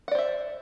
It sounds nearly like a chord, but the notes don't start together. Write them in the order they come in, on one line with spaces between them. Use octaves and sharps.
F#5 D5 C5 E5